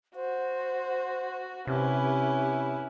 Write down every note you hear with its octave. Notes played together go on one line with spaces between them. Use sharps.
F#4 C5
C3 C#4 E4 G4 B4